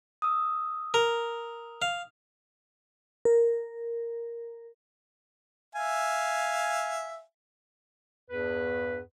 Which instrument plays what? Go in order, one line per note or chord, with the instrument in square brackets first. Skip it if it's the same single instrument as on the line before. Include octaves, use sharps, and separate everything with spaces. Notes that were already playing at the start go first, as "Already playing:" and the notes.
[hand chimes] D#6 E6
[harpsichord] A#4
F5
[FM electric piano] A#4
[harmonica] E5 F5 G#5
[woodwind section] E2 G2 B4